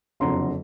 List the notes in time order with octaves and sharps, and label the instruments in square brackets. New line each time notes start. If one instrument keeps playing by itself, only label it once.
[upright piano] F#1 F2 D3 F#3 A#5 C6